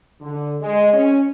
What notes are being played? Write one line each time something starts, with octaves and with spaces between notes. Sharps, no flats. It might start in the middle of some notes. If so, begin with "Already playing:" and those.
D3
G#3
C#4